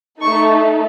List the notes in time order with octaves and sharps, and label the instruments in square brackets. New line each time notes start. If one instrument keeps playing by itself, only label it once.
[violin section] A3 D#4 A4 C#6